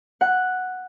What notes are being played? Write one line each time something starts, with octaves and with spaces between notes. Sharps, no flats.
F#5